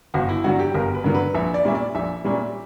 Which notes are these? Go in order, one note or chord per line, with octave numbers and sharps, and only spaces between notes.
G1 F#4
E4
G2 D3 F#3 F#4
G4
G1 A#4
B4
G2 D3 F#3 A#4
B4
A#1 E5
D5
A#2 G3 C#4 E5
D5
A#1 E5
A#2 G3 C#4